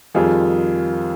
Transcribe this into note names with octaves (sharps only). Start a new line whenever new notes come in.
F2 D#3 G3 F4 G#4